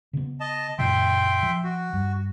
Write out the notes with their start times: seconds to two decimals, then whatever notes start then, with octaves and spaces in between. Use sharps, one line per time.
0.13 C#3 B3
0.40 D#5 A5
0.79 F#2 A#2 C#3 E5 G5 C6
1.43 F3
1.64 F#4
1.93 G2